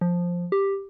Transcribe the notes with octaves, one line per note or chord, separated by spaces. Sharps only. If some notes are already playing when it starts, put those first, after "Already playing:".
F3
G4